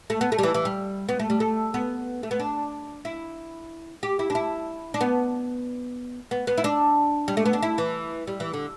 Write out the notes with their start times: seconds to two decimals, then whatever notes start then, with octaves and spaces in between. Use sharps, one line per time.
0.10 A3
0.21 B3
0.32 A3
0.38 G3
0.43 E3
0.54 E3
0.65 G3
1.09 B3
1.19 A3
1.30 G3
1.40 A3
1.74 B3
2.23 A3
2.31 B3
2.40 D4
3.05 E4
4.03 G4
4.19 E4
4.30 D4
4.35 E4
4.94 D4
5.01 B3
6.31 B3
6.47 B3
6.58 E4
6.64 D4
7.28 G3
7.37 A3
7.45 B3
7.53 D4
7.62 E4
7.78 E3
8.27 G3
8.40 E3
8.54 D3